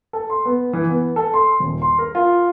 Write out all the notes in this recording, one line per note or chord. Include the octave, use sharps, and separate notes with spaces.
A4
C6
B3
E3
B3
A4
C6
D#1
C6
A#4
F4